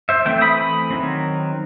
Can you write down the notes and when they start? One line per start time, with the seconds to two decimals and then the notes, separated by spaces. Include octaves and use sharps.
0.09 C5 E5
0.25 E3 A3 C4 E5 G5
0.41 B5 D#6
0.57 B5 D#6
0.91 D#3 F#3 C4